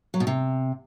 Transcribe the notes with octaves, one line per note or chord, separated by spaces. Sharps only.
F#3
B2
C3